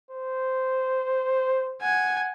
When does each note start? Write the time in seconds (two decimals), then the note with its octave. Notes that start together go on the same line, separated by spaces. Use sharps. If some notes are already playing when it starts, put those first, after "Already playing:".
0.10 C5
1.82 F#5 G#5